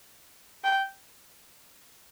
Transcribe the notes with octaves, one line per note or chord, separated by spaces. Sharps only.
G5